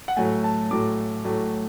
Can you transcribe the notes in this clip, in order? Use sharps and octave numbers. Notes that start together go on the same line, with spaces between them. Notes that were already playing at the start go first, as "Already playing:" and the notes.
F#5
A2 F#3 A3 G#5
A5
A2 F#3 A3 D6
A2 F#3 A3